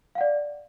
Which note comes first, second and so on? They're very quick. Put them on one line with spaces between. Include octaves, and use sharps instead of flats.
F5 F#5 D5